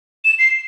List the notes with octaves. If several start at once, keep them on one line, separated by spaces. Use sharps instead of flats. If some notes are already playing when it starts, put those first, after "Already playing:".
E7
C7